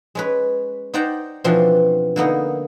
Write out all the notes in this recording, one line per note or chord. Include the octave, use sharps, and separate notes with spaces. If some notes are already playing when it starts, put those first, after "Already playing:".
G#3 C#4 B4
D#4 C5 D5 F#5 G5 A#5
B2 E3 F3 C4 D4 F4
D3 A#3 B3 D#4